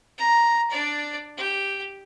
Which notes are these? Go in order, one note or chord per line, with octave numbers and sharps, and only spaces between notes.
A#5
D4 D5
G4